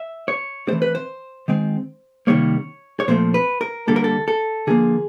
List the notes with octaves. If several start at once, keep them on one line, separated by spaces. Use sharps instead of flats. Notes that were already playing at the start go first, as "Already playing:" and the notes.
Already playing: E5
C#5
E3 A3 C4 C5
B4
C5
D#3 G#3 C4
C3 D#3 G3 A#3 C#5
C#5
A#2 F3 A3 C4 C5
B4
A#4
D3 G3 A#3 A4
A#4
A4
A4
D3 F3 A#3 G#4